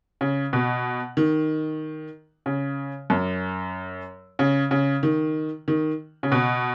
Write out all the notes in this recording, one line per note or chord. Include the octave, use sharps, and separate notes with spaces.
C#3
B2
D#3
C#3
F#2
C#3
C#3
D#3
D#3
C#3
B2